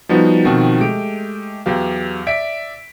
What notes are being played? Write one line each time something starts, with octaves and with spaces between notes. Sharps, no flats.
F3 G3 B3 D#4 F#4
B2 D#3 F3 C4 F#4
G#3 A3 G4 D7
E2 F#3 G4 F5
D5 E5 B6 D7